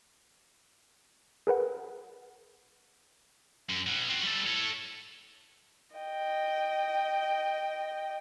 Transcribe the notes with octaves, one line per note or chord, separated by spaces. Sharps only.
G#4 A#4 B4 F#5
F#2
B2 F#3
C4 F#4
G3 A4
A4 C#5
D#5 G5